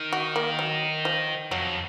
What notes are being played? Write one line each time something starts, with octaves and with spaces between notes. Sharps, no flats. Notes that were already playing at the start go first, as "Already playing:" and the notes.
Already playing: D#3
F#4
A#3
F#3
F3
F2 F#3